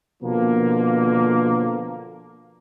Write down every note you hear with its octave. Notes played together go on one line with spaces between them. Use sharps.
B2 D3 F3 A#3